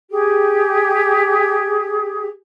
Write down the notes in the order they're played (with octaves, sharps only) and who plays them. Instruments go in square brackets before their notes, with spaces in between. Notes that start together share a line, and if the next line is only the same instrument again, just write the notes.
[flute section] G4 G#4